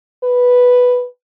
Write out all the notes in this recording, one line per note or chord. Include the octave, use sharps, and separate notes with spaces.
B4